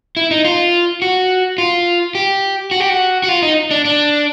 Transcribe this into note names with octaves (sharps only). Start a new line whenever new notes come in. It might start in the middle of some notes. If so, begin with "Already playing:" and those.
E4
D#4
F4
F#4
F4
G4
F#4
G4
F#4
F#4
F4
D#4
D4
D4